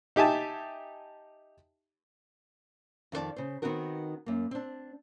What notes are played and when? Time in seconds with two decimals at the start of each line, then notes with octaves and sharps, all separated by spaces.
0.16 D#4 G4 E5 G#5 A5
3.12 F2 D#3 C#4 D5 A5
3.36 C#3 C5
3.62 D#3 B3 C4 D#4 F#4 A#4
4.26 F#2 A#3
4.51 C4 D4